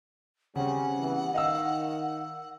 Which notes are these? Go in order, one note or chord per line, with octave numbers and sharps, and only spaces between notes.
C#3 G3 C4 C#4 F#5
E3 G3 B3
D#3 D#5 F5 E6